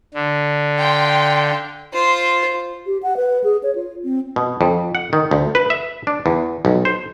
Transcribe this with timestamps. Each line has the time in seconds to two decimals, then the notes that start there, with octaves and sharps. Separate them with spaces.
0.14 D3
0.77 F5 G5 C6
1.93 F4 C5
2.86 G4
3.03 F#5
3.17 B4
3.44 G#4
3.63 C#5
3.75 F4
4.04 C4
4.36 B2
4.61 F2
4.95 F#5
5.13 D#3
5.31 D2
5.55 B4
5.70 E5
6.07 D4
6.26 E2
6.65 B1
6.85 C5